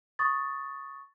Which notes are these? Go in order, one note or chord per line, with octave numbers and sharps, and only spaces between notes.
C#6 D#6 A6